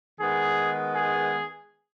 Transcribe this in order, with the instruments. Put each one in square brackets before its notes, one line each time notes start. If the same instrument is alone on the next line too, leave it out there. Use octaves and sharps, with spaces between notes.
[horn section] D#3 G#3 B3 G#4
G#4